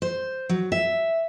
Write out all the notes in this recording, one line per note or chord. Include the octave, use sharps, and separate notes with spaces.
C5
F#3
E5